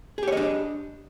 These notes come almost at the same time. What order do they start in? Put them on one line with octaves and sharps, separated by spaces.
G#4 G4 C#5 D#5 D4